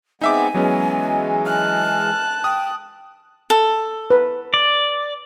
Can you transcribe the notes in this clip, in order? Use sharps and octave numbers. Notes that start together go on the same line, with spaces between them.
G#3 B3 C4 D#4 E5 G#5 D6
E3 F#3 G#3 B3 C#4
A5 F6 F#6
G5 D#6
A4
B4
D5